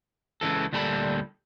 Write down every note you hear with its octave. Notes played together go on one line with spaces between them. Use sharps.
C#2 C#3 E3 A4
D2 A#2 G3 A4 A#5 B5